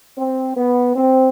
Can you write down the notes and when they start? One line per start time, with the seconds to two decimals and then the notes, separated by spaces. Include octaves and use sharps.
0.18 C4
0.57 B3
0.96 C4